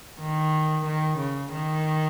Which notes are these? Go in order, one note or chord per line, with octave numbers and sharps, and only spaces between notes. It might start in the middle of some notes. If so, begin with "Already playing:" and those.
D#3
D#3
C#3
D#3